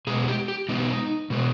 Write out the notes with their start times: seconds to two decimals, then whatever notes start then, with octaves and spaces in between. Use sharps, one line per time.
0.07 B2 G#3 B3 G#4
0.23 G#4
0.28 G4
0.48 G4
0.69 B2 G#3 B3 D#4
1.30 B2 G#3 B3